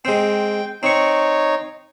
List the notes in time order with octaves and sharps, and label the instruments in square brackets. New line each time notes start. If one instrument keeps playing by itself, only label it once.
[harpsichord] G#3 C4 [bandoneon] G5
[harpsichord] C4 C#6 [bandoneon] D#4 C#5